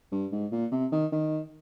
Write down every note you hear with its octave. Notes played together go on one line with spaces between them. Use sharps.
G2
G#2
A#2
C3
D#3
D#3